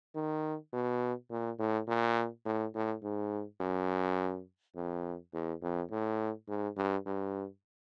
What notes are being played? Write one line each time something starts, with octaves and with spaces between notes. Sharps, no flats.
D#3
B2
A#2
A2
A#2
A2
A2
G#2
F#2
F2
E2
F2
A2
G#2
G2
G2